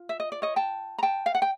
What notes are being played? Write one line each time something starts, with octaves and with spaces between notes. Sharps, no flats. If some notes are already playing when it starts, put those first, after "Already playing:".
Already playing: F4
E5
D#5
D5
C#5 D#5
G5 A5
A#5
G5 A5
F5
F#5
G5